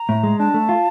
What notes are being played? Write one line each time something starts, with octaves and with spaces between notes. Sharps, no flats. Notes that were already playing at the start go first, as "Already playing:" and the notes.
Already playing: A#5
A2
G#3
D4 A5
A3
F4